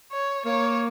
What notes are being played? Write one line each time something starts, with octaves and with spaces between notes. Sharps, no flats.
C#5
A#3 C#5